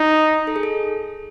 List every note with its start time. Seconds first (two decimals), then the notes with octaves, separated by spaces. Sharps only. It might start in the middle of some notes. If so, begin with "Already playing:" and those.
Already playing: D#4
0.47 A4
0.56 G#4
0.63 A4